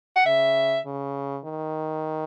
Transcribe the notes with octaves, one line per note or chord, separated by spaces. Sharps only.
F#5
C#3 E5
C#3
D#3